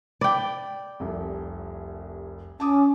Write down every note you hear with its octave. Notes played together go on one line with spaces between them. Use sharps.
D5 G5 B5
F1 C2
C#4 A5 D6 D#6